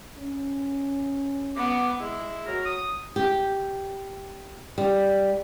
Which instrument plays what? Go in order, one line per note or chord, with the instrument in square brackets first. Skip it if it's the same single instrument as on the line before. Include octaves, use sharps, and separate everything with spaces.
[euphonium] C#4
[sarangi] B3 [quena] D6
[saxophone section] G#3 E4
[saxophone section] F#3 [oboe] A#4
[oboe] D#6
[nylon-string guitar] G4
G3